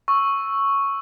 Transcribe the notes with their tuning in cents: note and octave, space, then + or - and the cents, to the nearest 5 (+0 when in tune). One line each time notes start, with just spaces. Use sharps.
C#6 +0 E6 +0